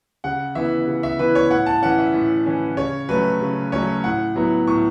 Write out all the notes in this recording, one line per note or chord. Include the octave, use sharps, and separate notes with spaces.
C#3 F#5
E3 B3 E4 E5
C#3
E5
E3 B3 E4 B4
C#5
A2 F#5
A5
E3 C#4 F#5
E5
A2
E3 C#4
C#3 C#5
F#3 A3 C#4 B4
C#3
F#3 A3 C#4 C#5
A2 F#5
F#3 B3 E4
A2 C#6